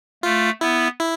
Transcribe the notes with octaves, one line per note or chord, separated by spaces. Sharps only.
A3 F4
B3 E4
E4